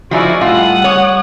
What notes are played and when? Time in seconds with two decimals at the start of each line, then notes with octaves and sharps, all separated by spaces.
0.11 F3 D#4 E4 F#4 G#4 D5
0.41 A2 G3 F4 F#5 D#6
0.84 C#5